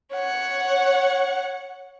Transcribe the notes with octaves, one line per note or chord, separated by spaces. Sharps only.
C#5 F#5